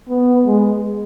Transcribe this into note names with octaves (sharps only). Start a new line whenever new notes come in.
B3
G#3